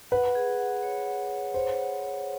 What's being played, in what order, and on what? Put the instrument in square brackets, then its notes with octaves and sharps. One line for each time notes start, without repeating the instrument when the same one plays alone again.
[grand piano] B4 [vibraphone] F#5
[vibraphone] G#4
F#5
C#5
F#5
C#5
[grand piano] C5 [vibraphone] C#5
[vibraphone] F#5
C#5